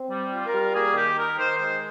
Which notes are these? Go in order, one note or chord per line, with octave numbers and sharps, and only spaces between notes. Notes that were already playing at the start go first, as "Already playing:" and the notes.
Already playing: C4
G3
F4
A#4
G3
A#3 G#4
D#3 G4
D#4 A#4
D#3 C5
G#3 C5